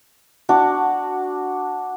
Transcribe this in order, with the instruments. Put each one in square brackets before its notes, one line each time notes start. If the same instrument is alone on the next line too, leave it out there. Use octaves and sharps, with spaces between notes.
[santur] D4 F#4